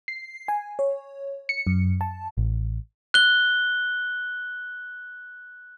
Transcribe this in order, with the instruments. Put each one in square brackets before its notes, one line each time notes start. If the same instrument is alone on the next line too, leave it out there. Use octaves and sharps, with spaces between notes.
[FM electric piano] C7
G#5
C#5
C#7
F#2
A5
[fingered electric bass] A1
[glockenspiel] F#6 G7